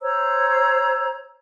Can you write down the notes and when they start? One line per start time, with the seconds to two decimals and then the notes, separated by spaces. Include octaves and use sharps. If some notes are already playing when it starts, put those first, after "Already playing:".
0.01 C5 C#5 A#5 E6